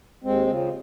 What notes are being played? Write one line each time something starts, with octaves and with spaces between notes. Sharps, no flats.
D#2 G#3 C4
C#3 F3